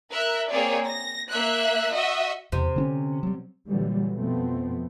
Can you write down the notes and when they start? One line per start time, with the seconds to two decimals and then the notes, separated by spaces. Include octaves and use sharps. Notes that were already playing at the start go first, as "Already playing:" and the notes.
0.11 A#4 E5 F#6
0.48 A#3 C4 G#4 C#5 D5
0.84 A#6
1.30 A#3 E5 F#6
1.94 F#4 D#5 E5
2.52 E2 C3
2.76 D3 C4 C#4
3.23 F#3 G3
3.68 A#2 D3 E3 F#3 G3
4.16 F2 B2 F3 A3 B3 C4